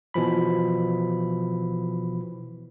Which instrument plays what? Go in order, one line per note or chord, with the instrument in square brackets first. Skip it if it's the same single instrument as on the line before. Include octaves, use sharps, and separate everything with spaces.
[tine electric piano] B2 E3 F3 B5